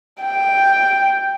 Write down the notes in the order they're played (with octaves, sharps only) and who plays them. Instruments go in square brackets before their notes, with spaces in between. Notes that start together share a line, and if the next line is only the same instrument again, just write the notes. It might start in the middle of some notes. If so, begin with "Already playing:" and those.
[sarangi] G5